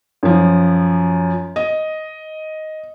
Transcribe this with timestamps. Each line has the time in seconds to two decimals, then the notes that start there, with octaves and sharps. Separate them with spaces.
0.23 F#2 F3
1.56 D#5